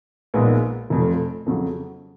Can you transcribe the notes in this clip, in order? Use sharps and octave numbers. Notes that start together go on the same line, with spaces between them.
A#1 A#2 G#3 B3 D#4
F1 F2 F3
F2 C#3 F#3